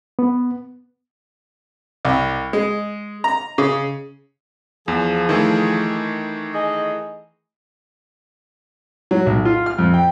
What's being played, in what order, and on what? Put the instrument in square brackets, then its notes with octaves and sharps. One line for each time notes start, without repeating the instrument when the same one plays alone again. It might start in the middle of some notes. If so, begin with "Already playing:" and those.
[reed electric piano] B3
[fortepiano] C2
G#3
A#5
C#3
[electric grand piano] E2 [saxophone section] F3 G#4
[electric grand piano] D#3 E3 A3
[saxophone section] G#4 D#5
[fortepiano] F#3
B1
F4
F6
F2
G5